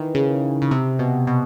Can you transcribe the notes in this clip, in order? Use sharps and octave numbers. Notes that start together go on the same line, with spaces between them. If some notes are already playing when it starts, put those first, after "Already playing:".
Already playing: D#3 E3
C#3
C#3
C3
B2
B2